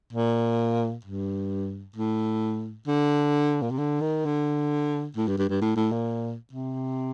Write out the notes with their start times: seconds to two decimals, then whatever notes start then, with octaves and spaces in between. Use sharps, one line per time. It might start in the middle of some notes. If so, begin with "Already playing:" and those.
0.13 A#2
1.05 G2
1.96 A2
2.87 D3
3.62 A#2
3.71 C3
3.78 D3
4.01 D#3
4.25 D3
5.16 A2
5.27 G2
5.38 G2
5.49 G2
5.61 A2
5.76 A2
5.92 A#2
6.53 C3